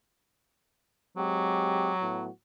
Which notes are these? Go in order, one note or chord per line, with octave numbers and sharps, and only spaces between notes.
F#3 G#3 C4 G4
A2 B3 F#4